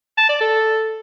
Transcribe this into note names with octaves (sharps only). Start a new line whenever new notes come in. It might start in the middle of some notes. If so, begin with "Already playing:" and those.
A5
D5
A4